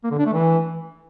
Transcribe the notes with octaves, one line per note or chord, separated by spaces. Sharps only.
A#3
D3
D4
A3
E3